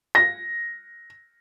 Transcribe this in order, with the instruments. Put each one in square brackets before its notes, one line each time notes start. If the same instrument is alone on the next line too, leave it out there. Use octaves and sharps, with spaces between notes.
[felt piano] A#6